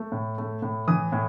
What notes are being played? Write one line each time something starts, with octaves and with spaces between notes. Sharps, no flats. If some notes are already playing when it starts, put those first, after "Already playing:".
Already playing: A3
A2
A3
A2
E3 D#6
A2